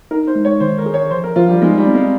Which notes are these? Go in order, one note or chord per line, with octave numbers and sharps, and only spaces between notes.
D#4 A#4
C5
G#3
C#5
D#3 C5
A#4
G#4
C#5
F3 C5
A#4
F3 F4
G3
G#3 D#4
G3
C4
G#3